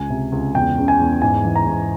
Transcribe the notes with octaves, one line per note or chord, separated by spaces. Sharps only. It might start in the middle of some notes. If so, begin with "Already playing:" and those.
Already playing: C#2 G#5
C3
C#2
E2 G5
C#3
G#5
E2
G#2 G#5
E3
A#5
G#2